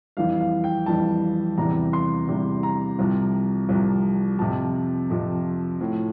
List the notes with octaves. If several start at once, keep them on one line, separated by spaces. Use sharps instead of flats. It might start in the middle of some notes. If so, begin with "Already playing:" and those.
F2 E3 G3 F5
F5
G5
F2 E3 G3 A5
E2 C3 E3 G3 A#5
C6
E2 C3 E3 G3
A#5
C2 C3 F3
C2 C3 F3
F2 C3 F3 A5
F2 C3 F3
A2 F3